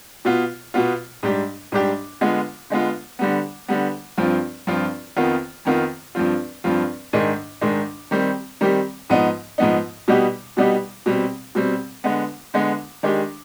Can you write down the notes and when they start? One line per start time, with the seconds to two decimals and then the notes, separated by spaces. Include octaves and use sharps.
0.25 B2 B3 F4
0.74 B2 B3 F4
1.23 G#2 G3 D4 G4
1.72 G#2 G3 D4 G4
2.21 D3 G#3 B3 F4
2.70 D3 G#3 B3 F4
3.19 D3 G3 B3
3.68 D3 G3 B3
4.18 G2 F3 C4 F4
4.67 G2 F3 C4 F4
5.16 F2 D#3 B3 F4
5.65 F2 D#3 B3 F4
6.15 G2 F3 C4 F4
6.64 G2 F3 C4 F4
7.13 G#2 D#3 G#3 D4
7.61 G#2 D#3 G#3 D4
8.11 D#3 G3 C4 G4
8.61 D#3 G3 C4 G4
9.10 G#2 F3 B3 D#4
9.58 G#2 F3 B3 D#4
10.08 B2 G3 B3 D#4 G4
10.57 B2 G3 B3 D#4 G4
11.06 B2 G3 C4
11.55 B2 G3 C4
12.04 D3 G#3 B3
12.54 D3 G#3 B3
13.03 D#3 G#3 D4 G4